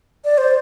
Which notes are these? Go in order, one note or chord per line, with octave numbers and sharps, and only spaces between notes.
D5
C5